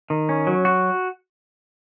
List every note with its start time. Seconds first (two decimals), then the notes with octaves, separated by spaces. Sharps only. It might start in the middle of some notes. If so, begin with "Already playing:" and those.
0.10 D#3
0.29 C#4
0.47 F#3
0.65 F#4